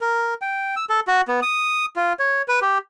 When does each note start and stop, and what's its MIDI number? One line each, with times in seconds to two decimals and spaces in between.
0.01 0.34 70
0.42 0.75 79
0.76 0.85 88
0.89 1.00 69
1.07 1.21 66
1.28 1.40 59
1.42 1.86 87
1.96 2.13 65
2.19 2.42 73
2.48 2.60 71
2.61 2.78 67